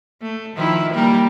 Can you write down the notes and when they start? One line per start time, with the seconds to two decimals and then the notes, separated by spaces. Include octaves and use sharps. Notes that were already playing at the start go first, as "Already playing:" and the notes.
0.22 A3
0.56 D#3 F3 E4
0.93 G3 A#3 A#4